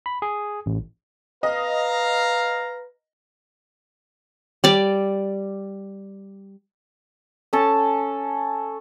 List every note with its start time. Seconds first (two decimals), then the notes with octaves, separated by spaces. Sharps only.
0.06 B5
0.22 G#4
0.66 A1
1.43 B4 D#5 F5 A#5
4.64 G3 D5
7.53 C#4 A4 A5